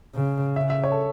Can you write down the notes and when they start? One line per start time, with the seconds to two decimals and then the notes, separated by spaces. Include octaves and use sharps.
0.15 C#3
0.56 C#3 E5
0.70 E5
0.84 C#5
0.92 A4